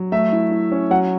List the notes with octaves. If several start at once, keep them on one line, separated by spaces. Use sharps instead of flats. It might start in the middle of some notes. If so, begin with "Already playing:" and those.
Already playing: F#3
A3 E5
E4
E4
C#4
F#3 F#5